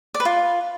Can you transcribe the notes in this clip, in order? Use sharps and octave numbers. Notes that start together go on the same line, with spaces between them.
D5
B4
F4